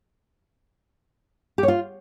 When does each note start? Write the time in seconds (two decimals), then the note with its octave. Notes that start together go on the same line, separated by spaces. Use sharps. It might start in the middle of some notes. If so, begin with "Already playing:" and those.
1.58 G4
1.63 C#5
1.68 F4